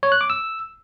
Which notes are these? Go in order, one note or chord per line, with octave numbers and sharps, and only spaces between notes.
C#5
F#6
D6
E6